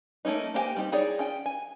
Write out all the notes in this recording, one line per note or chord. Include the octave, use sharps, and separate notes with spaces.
A3 A#3 C#4 D#4
A#3 D4 G4 C5 G#5
G3 C4 D#4 G4
D#4 E4 G#4 C#5 D5
C#4 G5
G#5